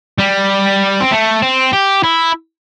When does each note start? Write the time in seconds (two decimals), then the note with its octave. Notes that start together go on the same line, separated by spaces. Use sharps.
0.19 G3
1.00 C4
1.11 A3
1.42 C4
1.73 G4
2.03 E4